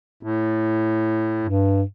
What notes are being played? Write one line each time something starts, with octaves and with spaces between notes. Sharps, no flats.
A2
G2